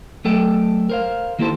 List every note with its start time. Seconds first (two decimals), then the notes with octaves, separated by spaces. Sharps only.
0.25 F#3 A3 A4 G5
0.89 A#4 C5 F5
1.39 D#3 A#3 E4 G4 A4 C5